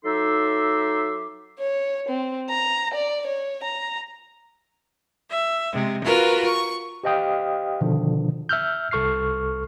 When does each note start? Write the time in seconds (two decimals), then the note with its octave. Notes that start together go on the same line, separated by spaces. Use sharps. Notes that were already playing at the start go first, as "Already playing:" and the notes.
0.05 F#3 D#4 A4 E5 C6 D6
1.59 C#5
2.08 C4
2.49 A#5
2.94 D5
3.27 C#5
3.64 A#5
5.30 E5
5.72 C3 G#3
6.03 F4 F#4 A#4 B4
6.45 C#6
7.04 G4 C5 D#5 F5 G5 D#6
7.81 B2 D3 D#3 F3 D4
8.49 E5 E6 F6 G6
8.91 C2 A4 C#6 F6 C7